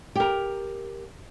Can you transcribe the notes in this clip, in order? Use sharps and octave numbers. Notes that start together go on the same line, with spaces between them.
G4 A#4